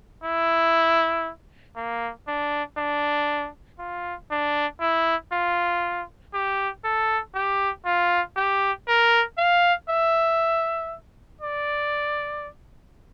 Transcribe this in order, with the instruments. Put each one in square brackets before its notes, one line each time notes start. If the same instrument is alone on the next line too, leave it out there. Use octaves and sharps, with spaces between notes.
[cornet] E4
A#3
D4
D4
F4
D4
E4
F4
G4
A4
G4
F4
G4
A#4
F5
E5
D5